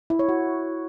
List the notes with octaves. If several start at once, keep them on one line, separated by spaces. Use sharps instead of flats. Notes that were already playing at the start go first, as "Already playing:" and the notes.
E4
C#5
F#4